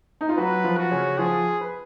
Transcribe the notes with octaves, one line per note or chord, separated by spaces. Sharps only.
D#4
F4
F#3 F#4 B4
F3 F4
F#4
C#3 C#4
F3 F4 G#4
B4